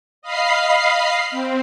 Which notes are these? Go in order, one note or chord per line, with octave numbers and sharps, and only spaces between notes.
D#5 F5 B5 C7
C4